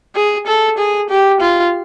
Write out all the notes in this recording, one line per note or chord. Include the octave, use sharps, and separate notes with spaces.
G#4
A4
G#4
G4
F4